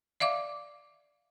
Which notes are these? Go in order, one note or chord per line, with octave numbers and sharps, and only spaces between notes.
D5 E5 F5 D6